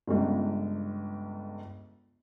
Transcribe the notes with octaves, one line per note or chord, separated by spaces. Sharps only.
G1 C#2